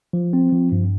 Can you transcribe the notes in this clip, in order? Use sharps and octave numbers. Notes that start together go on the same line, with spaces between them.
F3
C4
F3
G2